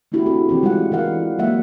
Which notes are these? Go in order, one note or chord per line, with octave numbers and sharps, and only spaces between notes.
A3 B3 D4 E4 F#4 G4
C4 D4 F#4 G#4 A4
E3 C4 G4
G3 G#3 C4 F4 F#5
E3 E4 A#4 F5 F#5
F#3 G#3 A#3 E5 F#5